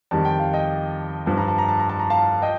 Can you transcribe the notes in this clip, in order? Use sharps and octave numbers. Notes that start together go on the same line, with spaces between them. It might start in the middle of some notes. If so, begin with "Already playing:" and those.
F2 D#3 G3 A5
G5
F5
D#5 G5
G2 F3 A5
A#5
A5
A#5
A5
A#5
A5
A#5
F5 A5
D#5 G5